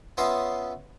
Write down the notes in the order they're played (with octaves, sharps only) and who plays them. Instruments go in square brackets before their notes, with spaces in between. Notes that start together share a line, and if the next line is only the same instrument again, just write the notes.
[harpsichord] B3 C#4 F4 D#5 E5 C6